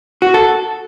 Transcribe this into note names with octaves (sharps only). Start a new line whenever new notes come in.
F#4
A4